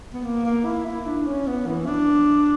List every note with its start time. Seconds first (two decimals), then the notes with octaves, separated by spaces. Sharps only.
0.14 B3
0.24 A#3
0.45 A#3
0.65 E4
0.86 E4
1.06 D4
1.26 C#4
1.47 B3
1.67 E3
1.87 D4